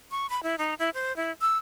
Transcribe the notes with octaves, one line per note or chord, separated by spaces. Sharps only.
C#6
B5
E4
D#4
E4
C5
E4
E6